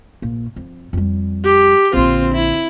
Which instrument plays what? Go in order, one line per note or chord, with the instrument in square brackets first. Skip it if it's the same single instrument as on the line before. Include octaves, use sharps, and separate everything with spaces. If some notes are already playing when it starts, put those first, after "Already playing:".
[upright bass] A#1 A#2
F2
F2 G3
[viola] G4
[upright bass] A#1 D3 [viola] C4 F4
[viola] E4